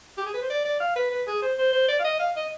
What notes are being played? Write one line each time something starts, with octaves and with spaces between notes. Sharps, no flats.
G4
G#4
B4
C5
D5
D5
F5
B4
B4
G#4
C5
C5
C5
D5
F5
D#5
F5
D#5